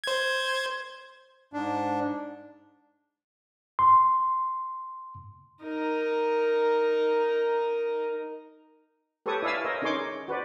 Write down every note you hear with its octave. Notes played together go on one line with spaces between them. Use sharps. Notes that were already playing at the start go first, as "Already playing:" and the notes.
C5 G#6
G#2 D4
C6
D#4 A#4
G4 A4 B4 C#5 C#6 D#6
E4 D5 E5 F5 G#5 E6
A#4 C5 C#5 D#5
C#4 D#4 G#4 C#5 C6 D6
F#4 B4 C5 D5